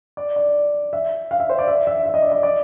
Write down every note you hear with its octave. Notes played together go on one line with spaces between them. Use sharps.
D5
D5
E5
F5
E5
C5
D5
E5
E5
E5
D#5
D5
D#5
D5